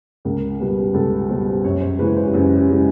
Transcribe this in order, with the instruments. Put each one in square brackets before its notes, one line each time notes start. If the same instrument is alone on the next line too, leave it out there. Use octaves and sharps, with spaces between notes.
[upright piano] C#2 A#4
B2 G3 B4
C#2 A4
B2 G3 C5
F#2 C#5
C5
C#3 E3 G#3 B4
C5
G4
F#2 G#4
G4
C#3 E3 G#3 G#4